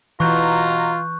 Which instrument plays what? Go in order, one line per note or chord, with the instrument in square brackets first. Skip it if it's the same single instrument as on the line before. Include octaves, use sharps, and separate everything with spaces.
[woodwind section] B2 A#5 [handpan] E3 [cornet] F4 [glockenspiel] C#6 F#6 G6